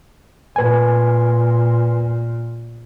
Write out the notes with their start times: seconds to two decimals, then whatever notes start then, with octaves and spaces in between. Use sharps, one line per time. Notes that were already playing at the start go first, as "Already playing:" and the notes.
0.56 A#2 B4 G#5